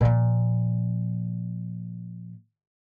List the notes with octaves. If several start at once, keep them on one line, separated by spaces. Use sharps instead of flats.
A#2 F3